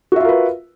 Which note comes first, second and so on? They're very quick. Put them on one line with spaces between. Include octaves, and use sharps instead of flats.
F#4 E5 F4 A#4 B4